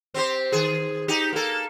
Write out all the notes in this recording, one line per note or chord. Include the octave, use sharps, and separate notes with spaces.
C4 G4 C5
D#3 G#4
D#4 G4
A#3 A4